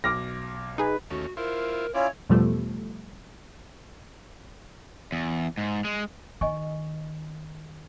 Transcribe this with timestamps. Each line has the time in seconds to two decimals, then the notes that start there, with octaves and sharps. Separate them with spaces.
0.04 B1 D6 F6 A#6
0.78 D#4 G#4 B4
1.10 D#2 A3 C#4 F#4
1.37 E4 F4 A#4 C5
1.94 C#4 E4 F4 C#5 D5
2.29 E2 B2 F3 G3 A3
5.12 E2
5.58 G#2
5.85 G#3
6.41 D#3 D#5 G#5 C#6